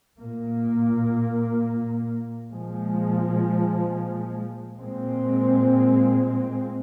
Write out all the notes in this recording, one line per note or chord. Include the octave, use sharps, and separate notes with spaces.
A#2 A#3
A#2 F3 G#3
A#2 G#3 C4